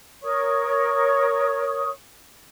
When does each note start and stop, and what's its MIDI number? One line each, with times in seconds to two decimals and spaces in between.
0.22 1.90 70
0.22 1.90 73
0.22 1.90 85
0.22 1.90 87